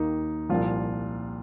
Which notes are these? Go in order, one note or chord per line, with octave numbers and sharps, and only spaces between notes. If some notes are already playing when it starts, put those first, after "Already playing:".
Already playing: D#2 D#3 A#3 D#4
C2 A#2 F3 F4